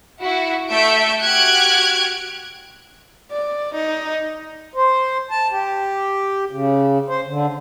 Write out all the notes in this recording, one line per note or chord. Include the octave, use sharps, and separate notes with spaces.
E4 F#4
A3 E5 C#6 G6 D7
F#4 G4 F6 F#6 G#6 D7
D5
D#4
C5
A5
G4
C#3
C5
D3